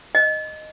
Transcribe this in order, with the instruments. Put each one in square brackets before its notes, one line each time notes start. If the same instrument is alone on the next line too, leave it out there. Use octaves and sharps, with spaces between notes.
[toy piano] D#5